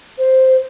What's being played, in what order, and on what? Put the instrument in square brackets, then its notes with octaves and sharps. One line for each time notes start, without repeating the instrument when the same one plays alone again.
[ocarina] C5